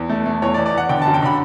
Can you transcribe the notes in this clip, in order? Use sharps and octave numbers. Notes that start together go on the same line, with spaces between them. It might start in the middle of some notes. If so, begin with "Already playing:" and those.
Already playing: E2
A3
A3
E2 C#5
D5
E2
D5
E2 F#5
D3 G5
F#2 A5
G5
D3 B5